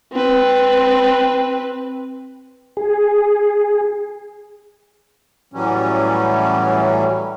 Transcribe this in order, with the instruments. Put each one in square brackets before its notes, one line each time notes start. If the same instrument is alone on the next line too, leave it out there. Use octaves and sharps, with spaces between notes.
[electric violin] C4 B4
[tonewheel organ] G#4
[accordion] A2 E3 F#3 G3 C#4